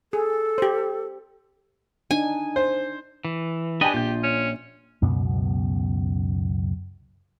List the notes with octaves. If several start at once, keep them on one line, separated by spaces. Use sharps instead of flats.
G#4 A4
G4 C5
D4 D#4 G#5
C5
E3
D4 G4 B4 D#5 G5 G#5
A#1 F4 G6
C#4
C#2 F#2 B2 B3